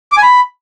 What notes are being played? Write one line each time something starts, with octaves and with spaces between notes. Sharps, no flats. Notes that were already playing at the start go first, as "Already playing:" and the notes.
D6
G#5
B5